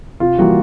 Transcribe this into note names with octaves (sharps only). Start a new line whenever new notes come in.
C3 F4
E3 G3 A#3 F#4